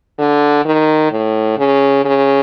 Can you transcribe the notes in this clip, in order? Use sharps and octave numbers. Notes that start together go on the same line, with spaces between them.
D3
D#3
A2
C#3
C#3